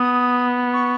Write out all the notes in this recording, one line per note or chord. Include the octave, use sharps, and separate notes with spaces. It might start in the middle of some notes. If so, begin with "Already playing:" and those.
Already playing: B3 D#6
C#6